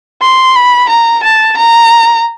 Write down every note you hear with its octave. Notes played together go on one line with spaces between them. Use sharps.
C6
B5
A#5
A5
A#5